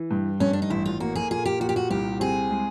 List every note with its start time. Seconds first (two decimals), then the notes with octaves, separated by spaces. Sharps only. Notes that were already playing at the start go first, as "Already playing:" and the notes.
Already playing: E3
0.11 G2
0.40 G2 C#4
0.53 D4
0.62 D#4
0.70 A1 E4
0.86 F4
1.00 A#3 F#4
1.16 G#4
1.31 A#2 G#4
1.46 G4
1.60 A#2 F#4
1.69 G4
1.76 F#4
1.90 C2 G4
2.20 C4 G#4
2.50 G#3